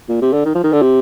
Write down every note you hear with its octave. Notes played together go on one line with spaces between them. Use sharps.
A#2
C3
D3
D#3
F3
D#3
D3
C3